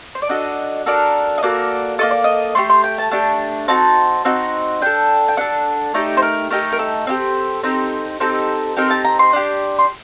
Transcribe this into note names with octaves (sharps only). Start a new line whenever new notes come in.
C5
D5
D4 F#4 A4 D#5
D4 F#4 A4 A#4
D#5
A#3 F#4 A4 D5
A#3 F#4 A4 D#5
D5
D#5
A3 D4 G4 C6
C6
G5
A5
A3 D4 G4
C4 D#4 F#4 A5
C4 D#4 F#4
D4 A4 G5
G5
D4 A4 F#5
A3 D#4 G4 D5
C5
A#4
A3 D#4 G4 A#4
A#4
A4
C4 D#4 G4
C4 D#4 G4
C4 D#4 G4 A4
C4 D#4 G4 A#4
A5
A#5
C6
D4 G4
C6